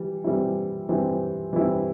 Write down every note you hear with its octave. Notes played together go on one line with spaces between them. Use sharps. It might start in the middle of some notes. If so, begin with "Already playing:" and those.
Already playing: E3 G3
E3 G3 C4 E4
E3 G3 C4 E4
E3 G3 C4 E4